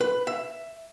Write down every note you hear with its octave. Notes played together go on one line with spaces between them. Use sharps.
B4
E5